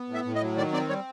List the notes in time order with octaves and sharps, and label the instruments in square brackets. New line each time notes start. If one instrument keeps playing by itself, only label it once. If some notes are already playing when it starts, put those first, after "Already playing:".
Already playing: [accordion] B3
A2
E5
A2
D#5
F#3
D#3 D5
C4 D5
G3 C#5